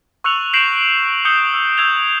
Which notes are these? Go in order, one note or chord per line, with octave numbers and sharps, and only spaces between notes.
C#6 E6 F#6 C#7 F7 F#7
G6 A#6 C7 D7 E7 F#7
D#6 E6 G6 C#7 F7 G7
E6
E6 G6 G#6 F7 G7